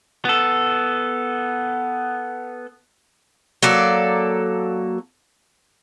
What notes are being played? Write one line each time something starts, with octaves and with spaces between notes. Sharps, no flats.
B3 A4
F#3 A#3 A4 D5